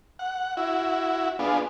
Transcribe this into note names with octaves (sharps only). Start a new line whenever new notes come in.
F#5
E4 F#4
B3 D4 F4 G#4